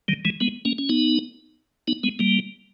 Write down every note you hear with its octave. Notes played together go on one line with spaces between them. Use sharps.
D#3 G3
E3 G#3
G#3 B3
A#3 C#4
C#4
B3 D#4
B3 D#4
G#3 B3
G3 A#3